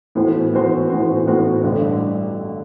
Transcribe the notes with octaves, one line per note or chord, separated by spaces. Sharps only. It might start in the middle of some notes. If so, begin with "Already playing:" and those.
A2 E3 B3 F#4 C5
A2 E3 B3 F#4 C5
A2 E3 B3 F#4 C5
A2 E3 B3 F#4 C5
A1 G2 D3 G3 D4